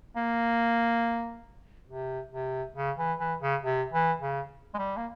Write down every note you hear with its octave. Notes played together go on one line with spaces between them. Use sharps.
A#3
C3
C3
C#3
E3
E3
C#3
C3
E3
C#3
G#3
G3
A#3